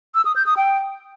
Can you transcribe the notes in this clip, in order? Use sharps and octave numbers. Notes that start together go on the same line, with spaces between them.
E6
D#6
G6
D#6
G5